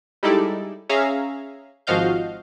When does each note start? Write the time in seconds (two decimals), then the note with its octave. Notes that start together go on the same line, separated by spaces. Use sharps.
0.23 G3 G#3 D#4 E4 A4 D5
0.89 C#4 G#4 E5 F5 A#5
1.87 G#1 F3 F#4 D#5 F5 G6